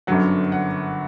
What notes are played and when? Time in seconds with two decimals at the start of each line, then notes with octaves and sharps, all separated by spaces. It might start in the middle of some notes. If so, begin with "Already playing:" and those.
0.07 G1 F#2 D3 F#3 F#5
0.52 F#5